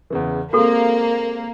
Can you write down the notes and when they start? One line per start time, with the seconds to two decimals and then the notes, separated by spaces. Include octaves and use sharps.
0.10 E2 C#3 E3
0.53 G#3 A#3 C4 F#4 A4